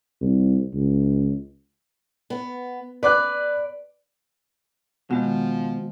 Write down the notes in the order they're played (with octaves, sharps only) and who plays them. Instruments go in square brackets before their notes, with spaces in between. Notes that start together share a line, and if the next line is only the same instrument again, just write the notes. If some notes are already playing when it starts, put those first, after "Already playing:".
[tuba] C2
C#2
[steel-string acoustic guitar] B3
[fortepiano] B4 D6 F#6 [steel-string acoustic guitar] D5
[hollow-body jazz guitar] B2 [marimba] D#3 G#3 F#4 [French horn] F3